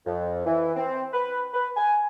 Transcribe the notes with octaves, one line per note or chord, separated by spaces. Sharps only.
F2
E3
C4
B4
B4
G#5